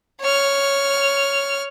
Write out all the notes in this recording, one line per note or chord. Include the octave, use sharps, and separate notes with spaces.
C#5 F6